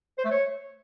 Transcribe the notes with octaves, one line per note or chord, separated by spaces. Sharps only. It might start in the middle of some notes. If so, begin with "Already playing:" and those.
C5
A3
C#5